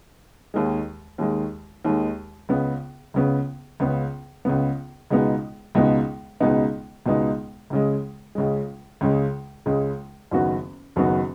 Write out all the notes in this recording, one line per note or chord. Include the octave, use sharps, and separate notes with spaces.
D#2 D#3 G#3
D#2 D#3 G#3
D#2 D#3 G#3
C#2 C#3 B3
C#2 C#3 B3
C#2 C#3 B3
C#2 C#3 B3
C#2 B2 G#3 B3 D#4
C#2 B2 G#3 B3 D#4
C#2 B2 G#3 B3 D#4
C#2 B2 G#3 B3 D#4
C#2 C#3 G#3
C#2 C#3 G#3
C#2 C#3 G#3
C#2 C#3 G#3
F#1 F#2 D#3 B3 F#4
F#1 F#2 D#3 B3 F#4